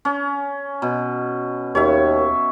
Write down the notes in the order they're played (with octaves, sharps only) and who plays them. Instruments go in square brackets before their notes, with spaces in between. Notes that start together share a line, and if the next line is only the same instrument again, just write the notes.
[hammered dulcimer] C#4
B2
[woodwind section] D#2 [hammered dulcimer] C#5 E5